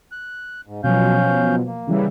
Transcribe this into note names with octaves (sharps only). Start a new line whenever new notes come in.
F#6
G#2
B2 F3 F#3 C#4 F5 G6
A#3
C#3 E3 G3